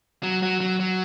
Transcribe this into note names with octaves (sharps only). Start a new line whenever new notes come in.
F#3
F#3
F#3
F#3